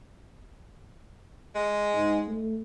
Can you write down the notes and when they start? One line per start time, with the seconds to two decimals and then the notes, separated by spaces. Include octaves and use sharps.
1.55 G#3
1.94 G#2
2.28 A3